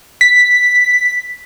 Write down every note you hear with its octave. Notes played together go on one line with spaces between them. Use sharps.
B6